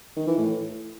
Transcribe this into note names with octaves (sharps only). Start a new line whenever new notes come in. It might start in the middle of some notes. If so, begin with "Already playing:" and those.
D#3
E3
A2